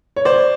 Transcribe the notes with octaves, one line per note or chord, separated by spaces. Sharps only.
C#5
C5 D5